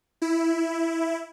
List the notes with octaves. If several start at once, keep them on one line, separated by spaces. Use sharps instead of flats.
E4